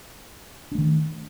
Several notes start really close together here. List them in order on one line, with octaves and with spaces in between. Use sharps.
D4 A3 D#3